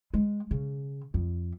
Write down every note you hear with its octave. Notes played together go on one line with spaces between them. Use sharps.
G#3
C#3
F2